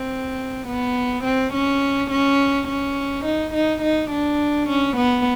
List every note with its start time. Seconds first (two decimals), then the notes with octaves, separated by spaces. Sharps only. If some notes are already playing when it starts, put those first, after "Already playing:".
Already playing: C4
0.68 B3
1.24 C4
1.54 C#4
2.11 C#4
2.68 C#4
3.25 D#4
3.54 D#4
3.82 D#4
4.11 D4
4.69 C#4
4.97 B3